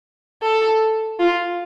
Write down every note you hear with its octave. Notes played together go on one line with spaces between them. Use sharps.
A4
F4